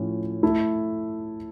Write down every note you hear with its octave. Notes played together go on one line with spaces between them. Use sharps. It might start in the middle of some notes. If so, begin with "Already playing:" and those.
Already playing: A2 F3 C#4
A3 E4 A4